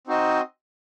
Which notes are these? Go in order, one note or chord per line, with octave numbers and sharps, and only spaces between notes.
C4 D#4 F#4 C5 D#5